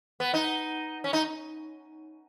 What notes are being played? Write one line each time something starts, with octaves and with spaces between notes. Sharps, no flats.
B3
D#4
C#4
D#4